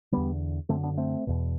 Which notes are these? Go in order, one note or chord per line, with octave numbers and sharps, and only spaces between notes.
E2 D3 G3 B3
F#2 D3 A3 C4
B3 D4
A3 C4
E2 B2